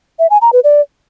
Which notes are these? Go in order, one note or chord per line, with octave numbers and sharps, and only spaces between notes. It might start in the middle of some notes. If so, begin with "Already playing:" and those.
E5
G#5
A#5
B4
D5